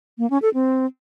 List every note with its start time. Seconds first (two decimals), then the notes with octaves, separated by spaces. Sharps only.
0.18 A#3
0.30 C#4
0.42 A4
0.54 C4